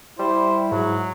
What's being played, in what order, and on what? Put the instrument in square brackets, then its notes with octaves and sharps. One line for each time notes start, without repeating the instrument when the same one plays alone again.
[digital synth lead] G3 [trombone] E4 [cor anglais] C5
[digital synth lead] G#2 [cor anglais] F#3